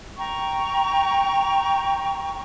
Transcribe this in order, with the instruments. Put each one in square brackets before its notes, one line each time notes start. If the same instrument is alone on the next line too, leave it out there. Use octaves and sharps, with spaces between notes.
[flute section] G5 A#5 C#6